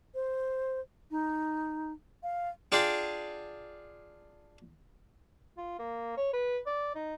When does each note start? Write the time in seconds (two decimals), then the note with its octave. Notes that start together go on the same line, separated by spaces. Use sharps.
0.15 C5
1.11 D#4
2.23 F5
2.72 D4 F4 G#4 D5 F#5 G5
5.58 F4
5.79 A#3
6.17 C#5
6.33 B4
6.66 D5
6.95 D#4